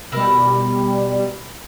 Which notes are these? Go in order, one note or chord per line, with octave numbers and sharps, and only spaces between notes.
B2 G3 E4 A#4 B4